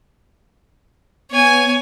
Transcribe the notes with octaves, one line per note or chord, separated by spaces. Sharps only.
B3 C#5 G#5